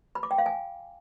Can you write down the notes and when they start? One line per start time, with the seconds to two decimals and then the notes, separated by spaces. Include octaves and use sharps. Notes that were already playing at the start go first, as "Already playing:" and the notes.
0.15 B5
0.23 D6
0.31 G5
0.38 F5
0.46 G#5